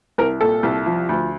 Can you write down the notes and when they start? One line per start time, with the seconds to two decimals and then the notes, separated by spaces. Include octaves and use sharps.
0.18 C2 A#4
0.41 A#2 A4
0.63 C2
0.86 F3
1.09 D2